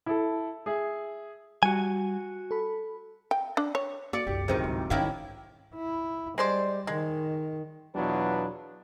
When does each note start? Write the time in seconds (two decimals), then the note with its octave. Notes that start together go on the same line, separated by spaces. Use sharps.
0.06 E4 A4
0.66 G#4 E5
1.63 G3 F#4 G#5
2.51 A4 B5
3.31 G5
3.57 D4
3.75 C#5
4.13 A#3 F#4 D5 D6 C#7
4.27 F#1 C2 G4
4.48 D1 C3 D#3 D#4 G#4 C5
4.64 D2 G#2 G#3
4.90 G#2 D#3 C#4 E4 C#5 F5 G5 B6
5.75 E4
6.38 G3 G#3 C5 D5
6.87 D#3 G#3
7.95 E2 B2 F#3 D4 F4 B4